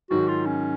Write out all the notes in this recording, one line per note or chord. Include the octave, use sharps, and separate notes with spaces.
G#2 D#3 F#3 F#4
F4
C#4